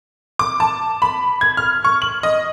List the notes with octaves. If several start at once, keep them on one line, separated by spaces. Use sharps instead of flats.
D6
A5
B5
G#6
F6
C#6
F#7
D#5